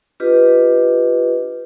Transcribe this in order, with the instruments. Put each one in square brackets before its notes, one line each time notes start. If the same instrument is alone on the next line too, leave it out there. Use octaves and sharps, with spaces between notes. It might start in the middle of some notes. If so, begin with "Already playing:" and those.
[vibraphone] D4 F4 G4 B4 D#5